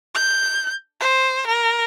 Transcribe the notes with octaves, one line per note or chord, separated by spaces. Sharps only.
G6
C5
A#4